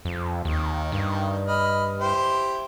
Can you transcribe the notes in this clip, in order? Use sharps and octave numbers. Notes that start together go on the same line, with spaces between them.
F2
D#2 D#3
G2
D#5 B5 F6
E4 G4 C5